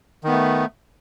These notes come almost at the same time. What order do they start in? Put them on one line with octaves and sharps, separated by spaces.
D#3 B3 A3